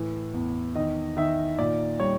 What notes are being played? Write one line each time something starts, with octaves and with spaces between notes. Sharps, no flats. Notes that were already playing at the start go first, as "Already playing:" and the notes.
Already playing: A2 E3
E2
D#3 D#5
D#3 E5
A#2 D5
G3 C#5